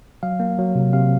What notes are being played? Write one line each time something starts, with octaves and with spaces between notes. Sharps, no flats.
F#3 F5
A#3
F#3
C3
C3 F5